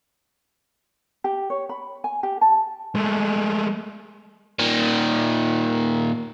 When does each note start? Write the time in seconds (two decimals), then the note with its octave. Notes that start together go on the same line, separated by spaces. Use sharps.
1.24 G4
1.50 C#5
1.69 B5
2.04 G#5
2.23 G4
2.41 A5
2.95 G#3 A3
4.59 A#2 D#3